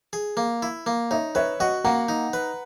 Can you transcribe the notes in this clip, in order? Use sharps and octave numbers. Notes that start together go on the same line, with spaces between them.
G#4
A#3
E4
A#3
D#4 C#5 E5
B4 C#5 E5
F#4 D#5 F#5
A#3 F#5 A#5
D#4
B4